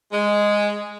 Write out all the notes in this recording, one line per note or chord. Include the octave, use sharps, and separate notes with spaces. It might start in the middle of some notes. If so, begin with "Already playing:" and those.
G#3